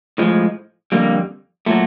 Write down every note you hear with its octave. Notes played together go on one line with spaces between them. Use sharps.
A2 F3 G#3
F2 D3 G3 A#3
A#2 F#3 A3